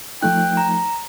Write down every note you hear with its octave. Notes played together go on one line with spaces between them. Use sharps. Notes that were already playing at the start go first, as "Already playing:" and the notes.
F3 A3 D#4 G5 F#6
A#5